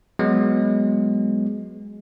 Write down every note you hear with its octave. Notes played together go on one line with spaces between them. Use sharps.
F#3 G#3 B3